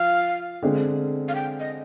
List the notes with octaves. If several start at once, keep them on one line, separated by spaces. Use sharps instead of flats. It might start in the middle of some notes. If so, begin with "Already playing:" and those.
Already playing: F3 F5
D3 G#3 C4
F5
G5
D#5